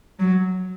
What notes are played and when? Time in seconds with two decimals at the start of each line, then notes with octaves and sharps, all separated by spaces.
0.19 F#3